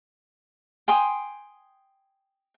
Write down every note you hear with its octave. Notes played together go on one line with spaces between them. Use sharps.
G5 G#5 C6 D#6